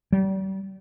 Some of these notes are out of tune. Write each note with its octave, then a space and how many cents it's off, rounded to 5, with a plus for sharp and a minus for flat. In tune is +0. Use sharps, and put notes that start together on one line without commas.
G3 -35